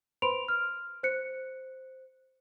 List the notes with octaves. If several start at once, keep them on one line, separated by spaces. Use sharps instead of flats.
B4 C5 B5 C6 D7 F7
F6
C5 F#6 C#7